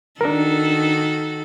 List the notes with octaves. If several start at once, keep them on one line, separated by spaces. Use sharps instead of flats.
D#3 D4 F#4 A4 A#4